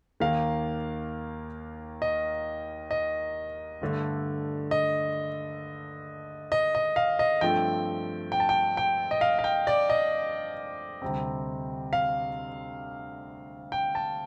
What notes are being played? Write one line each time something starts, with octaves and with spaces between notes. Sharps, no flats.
D#2 D#3 A#3 F5
D#5
D#5
G2 D3 A3
D#5
D#5
D#5
F5
D#5
G2 F3 A3 C4 G5
G5
A5
G5
G5
D#5
F5
F5
G5
D5
D#5
D2 C3 G3 C4
F5
G5
A5